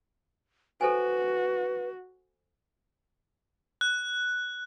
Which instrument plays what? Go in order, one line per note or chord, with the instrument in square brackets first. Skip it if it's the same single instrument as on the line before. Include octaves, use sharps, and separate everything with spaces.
[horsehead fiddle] F#4 [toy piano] A4 C5 G#5 [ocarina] B4
[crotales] F#6